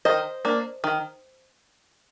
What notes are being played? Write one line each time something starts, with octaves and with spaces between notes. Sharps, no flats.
D#3 C5 D#5
A#3 D4
D#3